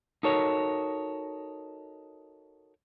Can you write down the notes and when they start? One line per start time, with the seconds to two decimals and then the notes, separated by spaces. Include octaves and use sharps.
0.23 D#4 F#4 A4 A#4 C#5